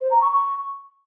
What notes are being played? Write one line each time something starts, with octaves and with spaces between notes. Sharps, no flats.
C5
A#5
C#6
C#6